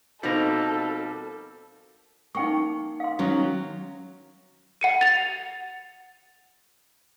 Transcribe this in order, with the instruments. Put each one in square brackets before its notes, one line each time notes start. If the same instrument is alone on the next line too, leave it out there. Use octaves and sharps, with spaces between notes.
[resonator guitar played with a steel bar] B2 F3 A#3 [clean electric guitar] G3 A#5 [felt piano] C4 D#4 [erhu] A4
[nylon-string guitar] A#3 [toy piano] D#4 G5 C#6
[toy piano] F5 C6
[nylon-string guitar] D#3 F#3 C#4
[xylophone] F#5 C#7 D#7
A6 F7